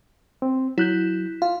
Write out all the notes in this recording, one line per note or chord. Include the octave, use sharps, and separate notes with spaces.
C4
F#3 E4 F#6 G6
F4 F5